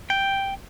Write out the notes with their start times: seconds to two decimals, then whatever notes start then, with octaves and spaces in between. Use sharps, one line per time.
0.10 G5